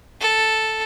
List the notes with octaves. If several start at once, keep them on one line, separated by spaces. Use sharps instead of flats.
A4